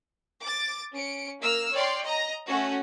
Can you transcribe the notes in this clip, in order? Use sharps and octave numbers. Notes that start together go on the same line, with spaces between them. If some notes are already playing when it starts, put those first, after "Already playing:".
D6 A6
C#4 C#7 D7
A#3 E6 F6
C#5 D5 G5 C6 F6
D#5 A#5 A#6
A3 C#4 F#4